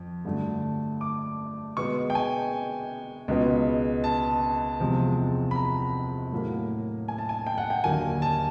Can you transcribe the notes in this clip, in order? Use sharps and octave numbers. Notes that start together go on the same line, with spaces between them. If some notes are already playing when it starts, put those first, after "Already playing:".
Already playing: F2
G2 D3 F#3 A3
D6
B2 G#3 B3 C#6
G5
G#5
C#2 B2 G#3 B3
A5
E2 C3 F3 G#3 C4
B5
A#5
A2 F#3 A#3
G#5
A5
G#5
G5
F#5
G5
D#2 D3 F#3 A#3 G#5
A5